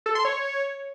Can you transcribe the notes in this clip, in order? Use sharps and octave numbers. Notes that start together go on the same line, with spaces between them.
A4
C6
C#5